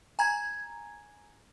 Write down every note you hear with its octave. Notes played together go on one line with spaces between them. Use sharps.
G#5 A#5 G#6